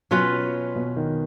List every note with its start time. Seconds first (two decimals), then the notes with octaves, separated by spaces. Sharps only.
0.11 B2 F#3 C#4 F4 B4
0.76 B2
0.96 D#3